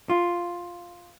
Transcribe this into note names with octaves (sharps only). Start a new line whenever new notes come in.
F4